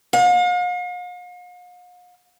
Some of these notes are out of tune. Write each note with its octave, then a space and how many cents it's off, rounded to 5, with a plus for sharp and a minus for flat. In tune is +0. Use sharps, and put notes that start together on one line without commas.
F5 +45